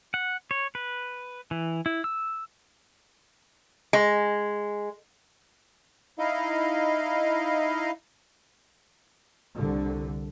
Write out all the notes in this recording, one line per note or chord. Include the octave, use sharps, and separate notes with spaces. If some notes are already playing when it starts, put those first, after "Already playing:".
F#5
C#5
B4
E3
E4
E6
G#3
D#4 E4 D#5 F5
C2 D3